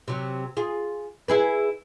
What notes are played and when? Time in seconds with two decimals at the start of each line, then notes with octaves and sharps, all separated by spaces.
0.08 C3 F#3
0.57 F4 G#4
1.28 E4 G#4 B4